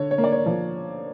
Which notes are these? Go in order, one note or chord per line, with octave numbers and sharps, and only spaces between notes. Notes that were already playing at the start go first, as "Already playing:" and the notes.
Already playing: D3 C#5
C#5
A#3
D5
C#5
F3